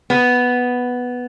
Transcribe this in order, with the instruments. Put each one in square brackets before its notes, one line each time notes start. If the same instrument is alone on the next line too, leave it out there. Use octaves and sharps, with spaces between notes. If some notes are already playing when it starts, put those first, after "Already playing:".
[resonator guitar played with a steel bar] B3